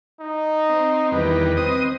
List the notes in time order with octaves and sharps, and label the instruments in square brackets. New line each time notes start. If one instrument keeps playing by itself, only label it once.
[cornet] D#4
[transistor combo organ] C4
[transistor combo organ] E2 D#3 G3 [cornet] B4
[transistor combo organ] C4 D#5 D#6